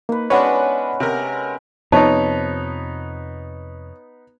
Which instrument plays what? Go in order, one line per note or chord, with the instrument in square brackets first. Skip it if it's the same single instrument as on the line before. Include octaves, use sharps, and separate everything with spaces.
[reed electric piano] A#3 [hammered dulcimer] D#4 B4
[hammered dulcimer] G#3 B3 C#4 [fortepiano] D4 F#4 B4 [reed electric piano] C#5 F#5
[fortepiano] C3 A#4
[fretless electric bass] F2 C3 F3 [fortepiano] B3 D#4 [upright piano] C#5 [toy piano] A5